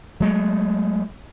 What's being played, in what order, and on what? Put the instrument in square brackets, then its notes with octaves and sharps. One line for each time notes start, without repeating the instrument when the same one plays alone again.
[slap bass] F#3 G#3 A3